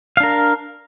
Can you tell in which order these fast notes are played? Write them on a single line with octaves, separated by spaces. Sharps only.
F5 D4 A#4